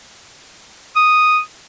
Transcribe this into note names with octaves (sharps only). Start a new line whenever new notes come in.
D#6